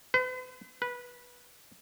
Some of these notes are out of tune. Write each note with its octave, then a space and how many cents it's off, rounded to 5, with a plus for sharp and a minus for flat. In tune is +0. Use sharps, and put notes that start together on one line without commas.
B4 +45
B4 -15